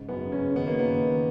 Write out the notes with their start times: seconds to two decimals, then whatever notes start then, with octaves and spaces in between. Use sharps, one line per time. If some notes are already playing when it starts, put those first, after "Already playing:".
Already playing: G#2 C#3
0.09 F#2 B3
0.32 C#3 C#4
0.56 D#3 B3
0.67 A#3
0.79 D#3 B3
1.02 D#3